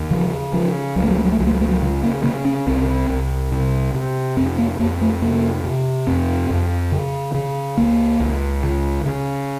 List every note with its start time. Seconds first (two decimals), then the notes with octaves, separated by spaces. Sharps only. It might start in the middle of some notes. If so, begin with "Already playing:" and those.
Already playing: D#2
0.11 C#3 F3
0.53 C#3 F3
0.96 C#2 F#3
1.04 A3
1.11 F#3
1.18 A3
1.25 F#3
1.32 A3
1.39 C#2 F#3
1.47 A3
1.54 F#3
1.61 A3
1.69 F#3
1.82 C#3
2.03 A#3
2.23 C#3 A#3
2.45 C#4
2.67 C2 C4
3.10 C2
3.52 C3
3.95 C3
4.37 F2 C4
4.58 A#3
4.79 F2 A#3
5.01 A3
5.22 C3 A#3
5.64 C3
6.07 F2 C4
6.50 F2
6.92 C#3
7.34 C#3
7.77 C#2 A#3
8.20 C#2
8.63 C#3
9.05 C#3